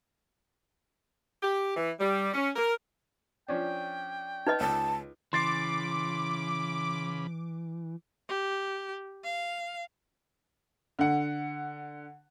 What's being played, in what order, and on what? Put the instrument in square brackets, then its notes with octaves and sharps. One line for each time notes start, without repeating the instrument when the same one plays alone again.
[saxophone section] G4
E3
G3
C#4
A#4
[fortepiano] F3 C#4 D4 [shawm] G5
[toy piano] D#4 B4 D#5
[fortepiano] C#2 [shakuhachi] A5
[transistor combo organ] C#3 B5 [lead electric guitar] E3 [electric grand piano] C6 A6 C7 [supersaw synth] D6
[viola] G4
F5
[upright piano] D3 F#5